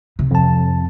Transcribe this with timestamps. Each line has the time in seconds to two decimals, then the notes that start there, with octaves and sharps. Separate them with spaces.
0.19 C3
0.31 F2 A5